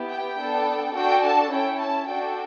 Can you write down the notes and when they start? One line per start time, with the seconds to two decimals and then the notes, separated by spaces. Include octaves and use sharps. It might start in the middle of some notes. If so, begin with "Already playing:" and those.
Already playing: B3 E4 G4
0.10 G5
0.38 B3 D4 A4
0.94 D4 F#4 A4 G5
1.24 A5
1.51 C#4 E4 A4 G5
1.80 A5
2.08 D4 F#4 A4 G5